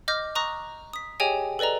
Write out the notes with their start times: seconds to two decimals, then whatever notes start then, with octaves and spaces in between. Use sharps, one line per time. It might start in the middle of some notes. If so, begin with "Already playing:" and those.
0.08 D#5 D6 F6 G6 A#6
0.35 A#5 C#6 D#6 F#6 A#6
0.93 D#6 B6
1.20 G4 G#4 C#5 D#5 G5 G#5
1.59 A4 B4 D5 D#5 A#5